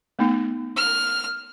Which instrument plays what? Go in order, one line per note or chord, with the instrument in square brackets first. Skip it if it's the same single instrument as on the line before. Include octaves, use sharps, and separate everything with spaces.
[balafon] A3 B3 D#4
[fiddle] F6